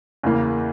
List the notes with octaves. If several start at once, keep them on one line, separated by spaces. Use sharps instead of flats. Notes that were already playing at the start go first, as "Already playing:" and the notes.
E2 C#3 E3 A#3